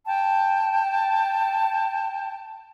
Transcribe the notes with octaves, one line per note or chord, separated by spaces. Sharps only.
G5 A5